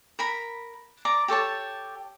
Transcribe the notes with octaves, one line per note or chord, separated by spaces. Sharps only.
A#4 A#5 B5
D5 A#5 D6
G4 A4 C#5 A5